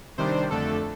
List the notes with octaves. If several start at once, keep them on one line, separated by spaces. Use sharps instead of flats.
C3 D#3 G3 D4 C5
F2 D3 A3 D4 A4